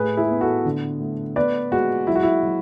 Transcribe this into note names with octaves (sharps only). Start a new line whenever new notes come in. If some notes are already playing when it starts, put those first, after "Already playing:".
Already playing: A2 A3 G#4 B4
E4 G#4
B3
F#4 A4
D3
A3
B3 B4 D5
G#3 F#4
F#3 E4
F#4
E4
F#3